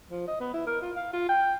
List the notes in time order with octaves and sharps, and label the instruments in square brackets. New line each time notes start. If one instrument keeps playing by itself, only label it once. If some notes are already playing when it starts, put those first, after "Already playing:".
[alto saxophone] F3
D#5
B3
E4
A#4
F4
F5
F4
G5